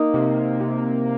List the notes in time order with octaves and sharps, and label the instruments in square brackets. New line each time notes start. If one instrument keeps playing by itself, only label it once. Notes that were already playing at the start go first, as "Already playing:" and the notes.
Already playing: [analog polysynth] A#3 [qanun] D#4
[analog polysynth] C3
C3